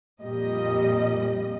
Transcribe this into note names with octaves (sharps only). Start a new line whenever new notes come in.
F2 A#2 G3 D#5